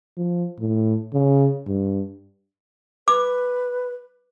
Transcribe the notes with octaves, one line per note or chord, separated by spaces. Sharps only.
F3
A2
C#3
G2
B4 D6